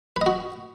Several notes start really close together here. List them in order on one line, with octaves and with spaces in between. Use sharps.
B4 D#5 F#4